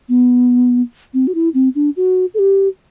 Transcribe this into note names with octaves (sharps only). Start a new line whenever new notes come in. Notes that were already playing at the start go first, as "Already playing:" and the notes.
B3
C4
F#4
E4
C4
D4
F#4
A4
G4